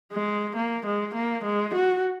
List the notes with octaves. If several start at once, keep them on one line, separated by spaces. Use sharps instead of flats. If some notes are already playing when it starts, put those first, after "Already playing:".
G#3
A#3
G#3
A#3
G#3
F#4